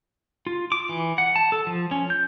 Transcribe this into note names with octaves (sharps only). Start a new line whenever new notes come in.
F4
D6
E3
F#5
A5
A4
F3
C#4
G6